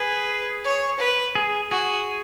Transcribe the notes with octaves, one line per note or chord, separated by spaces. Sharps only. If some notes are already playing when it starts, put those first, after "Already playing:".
Already playing: G#4 B4
C#5
B4
G#4
F#4 G#4